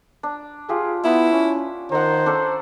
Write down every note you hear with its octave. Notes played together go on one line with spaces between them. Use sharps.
D4
F4 G4 G#4
B3 E4
C#4
D#3 C5 F#5 A#5
C#4 D4 A4